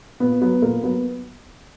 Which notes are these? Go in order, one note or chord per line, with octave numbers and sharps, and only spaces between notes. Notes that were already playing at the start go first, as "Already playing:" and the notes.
A#2 B3
F#3 B3
A#2 A#3
F#3 B3